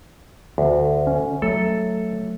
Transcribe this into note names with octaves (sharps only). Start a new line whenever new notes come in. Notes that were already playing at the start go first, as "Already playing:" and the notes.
D2
C#4
F#3 A3 A4